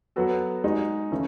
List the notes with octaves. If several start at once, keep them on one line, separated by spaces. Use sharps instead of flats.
F#3 B3 F#4 A4
G#3 D#4 F#4
C#3 E3 A3 C#4